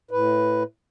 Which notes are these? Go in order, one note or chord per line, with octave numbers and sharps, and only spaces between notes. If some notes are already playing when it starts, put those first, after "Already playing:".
A2 B4